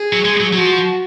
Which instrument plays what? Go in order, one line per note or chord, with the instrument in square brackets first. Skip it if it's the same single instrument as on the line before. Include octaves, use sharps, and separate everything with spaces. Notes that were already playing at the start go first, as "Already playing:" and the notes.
Already playing: [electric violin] G#4
[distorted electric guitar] F#3
G#3
F#3
F#3
[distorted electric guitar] F3 [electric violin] F#4